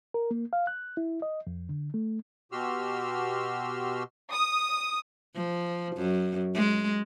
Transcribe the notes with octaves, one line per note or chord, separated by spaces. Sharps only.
A#4
A#3
F5
F#6
E4
D#5
F2
D3
A3
B2 F#4 G4 C6 E6 F6
D#6
F3
F#2
G#3